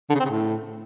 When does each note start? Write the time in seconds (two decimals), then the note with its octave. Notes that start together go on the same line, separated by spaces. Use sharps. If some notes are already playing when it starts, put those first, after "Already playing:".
0.10 D3
0.15 C#3
0.20 C4
0.25 C#3
0.30 A2